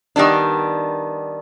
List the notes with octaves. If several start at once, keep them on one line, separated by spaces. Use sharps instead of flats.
D#3 G3 B3 D4